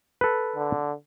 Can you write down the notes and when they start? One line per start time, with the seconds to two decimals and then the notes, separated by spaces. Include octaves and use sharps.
0.21 A4 B4
0.56 D3